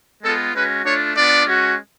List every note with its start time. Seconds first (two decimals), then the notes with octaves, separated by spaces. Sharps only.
0.24 G#3 B3 F4 A4
0.54 G#3 C#4 F#4 B4
0.85 A3 D4 F4 C#5
1.15 B3 D4 F4 D5
1.46 G#3 C#4 F#4